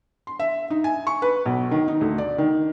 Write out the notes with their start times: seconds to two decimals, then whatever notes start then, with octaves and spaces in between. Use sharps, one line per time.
0.27 C6
0.39 E5
0.70 D#4
0.84 G#5
1.07 C#6
1.22 B4
1.46 B1
1.71 D#3
1.88 D#4
2.01 D2
2.18 D5
2.38 D#3